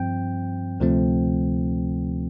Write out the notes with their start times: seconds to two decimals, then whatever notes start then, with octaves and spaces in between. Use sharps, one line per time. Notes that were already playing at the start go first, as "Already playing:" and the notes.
Already playing: G2 F3 C4 G5
0.80 D2 C3 F3 A3 C4